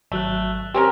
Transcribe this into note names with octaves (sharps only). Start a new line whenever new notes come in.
G#1 F#3 A3 F#6
C4 C#4 G4 A#4